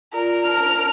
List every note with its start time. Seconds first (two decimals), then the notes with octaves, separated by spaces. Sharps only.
0.13 F4 A#4 D5
0.46 A5 F6